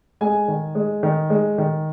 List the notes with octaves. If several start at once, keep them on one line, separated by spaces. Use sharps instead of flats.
G#3 G#5
D#3
G#3
D#3
G#3
D#3